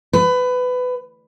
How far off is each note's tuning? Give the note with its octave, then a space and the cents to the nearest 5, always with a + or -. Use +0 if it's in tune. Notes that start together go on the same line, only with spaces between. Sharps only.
B4 +20